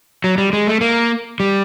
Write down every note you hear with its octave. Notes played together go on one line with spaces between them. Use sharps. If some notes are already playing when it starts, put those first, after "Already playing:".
F#3
G3
G#3
A3
A#3
G3